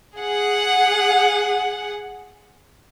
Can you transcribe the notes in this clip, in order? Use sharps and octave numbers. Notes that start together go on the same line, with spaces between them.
G#4 F#5